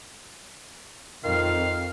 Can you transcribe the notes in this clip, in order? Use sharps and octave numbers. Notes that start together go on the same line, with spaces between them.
F2 D#3 F5